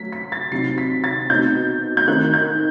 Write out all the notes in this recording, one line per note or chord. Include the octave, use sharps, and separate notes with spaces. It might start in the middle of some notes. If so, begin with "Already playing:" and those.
Already playing: F#3 A3 B6
B6
A6
C3 F#3 C4 D#4 C7
B6
A6
B2 A3 C4 D#4 G6
G6
D#3 A3 C4 D#4 F#6
G6